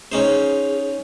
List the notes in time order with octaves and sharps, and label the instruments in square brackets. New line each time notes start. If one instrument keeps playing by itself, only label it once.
[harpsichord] C#4 D#4 C5 [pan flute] G#4